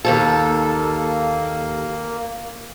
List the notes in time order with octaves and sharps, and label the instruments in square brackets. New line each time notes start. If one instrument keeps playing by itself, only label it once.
[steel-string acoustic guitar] D#2 G#2 A4 [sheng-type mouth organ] A#3